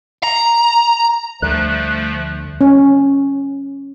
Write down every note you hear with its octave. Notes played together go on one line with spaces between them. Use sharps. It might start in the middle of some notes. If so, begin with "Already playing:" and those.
A#5
D2 D3 F3 G3 A3 F#6
C#4